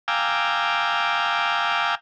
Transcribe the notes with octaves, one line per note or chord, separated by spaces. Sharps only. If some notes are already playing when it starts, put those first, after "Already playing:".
F5 G5 G#5 A#5 D6 E6